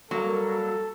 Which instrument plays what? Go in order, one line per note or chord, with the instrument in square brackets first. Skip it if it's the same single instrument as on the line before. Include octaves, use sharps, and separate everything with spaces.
[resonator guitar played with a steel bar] F#3 [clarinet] G3 [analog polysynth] A#3 [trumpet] A4